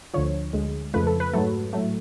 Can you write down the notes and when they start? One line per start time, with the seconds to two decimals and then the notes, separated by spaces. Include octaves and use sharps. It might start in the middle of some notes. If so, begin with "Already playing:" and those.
0.14 D2 D3 F3 C#5
0.53 D2 D3 G#3
0.94 F2 C#3 F3 A3 B4
1.07 A4
1.20 B4
1.33 G#2 F#3 A3 A4
1.73 A2 F#3 A3